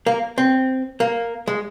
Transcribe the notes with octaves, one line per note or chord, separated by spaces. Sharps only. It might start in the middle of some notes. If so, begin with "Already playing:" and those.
A#3
C4
A#3
G#3